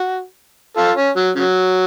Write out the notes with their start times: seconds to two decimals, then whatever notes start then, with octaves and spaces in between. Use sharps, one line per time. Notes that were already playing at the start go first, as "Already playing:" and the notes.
Already playing: F#4
0.77 F4 A4
0.97 C#4
1.16 F#3
1.35 C#3 F#3